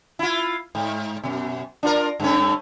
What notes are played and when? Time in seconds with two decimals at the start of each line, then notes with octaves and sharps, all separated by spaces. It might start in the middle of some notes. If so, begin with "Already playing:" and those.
0.19 E4 F4
0.75 G#2
1.23 F#2 B2
1.83 D4 F4 A#4
2.20 G2 A3 C#4